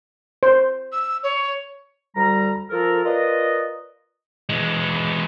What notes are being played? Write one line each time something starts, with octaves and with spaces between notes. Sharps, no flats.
C5
E6
C#5
D2 G3 A#5
F3 A4 A#4
F4 A#4 B4 D5 D#5
E3 G#3